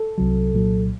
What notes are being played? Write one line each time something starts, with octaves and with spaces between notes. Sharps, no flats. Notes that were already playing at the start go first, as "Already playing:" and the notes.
Already playing: A4
C2 C3 F#3
C2 A#2 F#3